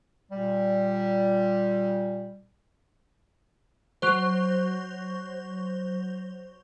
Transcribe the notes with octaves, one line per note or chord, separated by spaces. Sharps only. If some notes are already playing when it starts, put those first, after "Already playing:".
A#2 G3
F#3 C5